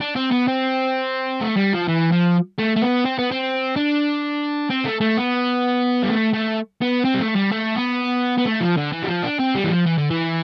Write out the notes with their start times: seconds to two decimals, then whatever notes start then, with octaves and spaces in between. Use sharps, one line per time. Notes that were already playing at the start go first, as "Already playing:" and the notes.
0.01 D4
0.16 C4
0.31 B3
0.48 C4
1.41 A3
1.56 G3
1.73 F3
1.88 E3
2.12 F3
2.59 A3
2.76 A3
2.82 B3
3.05 C4
3.19 B3
3.31 C4
3.76 D4
4.70 C4
4.85 A3
5.01 A3
5.17 B3
6.03 G3
6.10 A3
6.34 A3
6.82 B3
7.05 C4
7.14 G3
7.20 A3
7.36 G3
7.51 A3
7.76 B3
8.38 B3
8.46 A3
8.61 F3
8.77 D3
8.93 E3
9.03 G3
9.08 F3
9.23 D4
9.39 C4
9.55 G3
9.64 E3
9.71 F3
9.86 E3
9.98 D3
10.10 E3